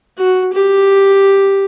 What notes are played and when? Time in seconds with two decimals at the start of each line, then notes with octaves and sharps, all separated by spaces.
0.18 F#4
0.53 G4